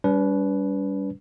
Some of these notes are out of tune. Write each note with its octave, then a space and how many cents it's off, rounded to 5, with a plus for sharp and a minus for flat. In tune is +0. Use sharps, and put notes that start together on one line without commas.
G3 +0 D4 -45 B4 +0